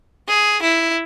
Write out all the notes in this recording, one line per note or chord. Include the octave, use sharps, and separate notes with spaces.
G#4
E4